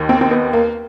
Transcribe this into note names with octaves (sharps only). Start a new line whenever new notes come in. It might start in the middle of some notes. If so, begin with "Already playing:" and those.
Already playing: D#2 D#3
C4
C4
B3
A#3